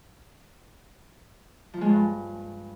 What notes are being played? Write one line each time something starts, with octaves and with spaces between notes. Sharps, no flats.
F3
G#3
G2